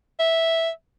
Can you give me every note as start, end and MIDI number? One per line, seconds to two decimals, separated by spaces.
0.19 0.69 76